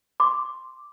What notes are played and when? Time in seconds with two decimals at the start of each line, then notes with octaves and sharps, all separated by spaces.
0.20 C6 D6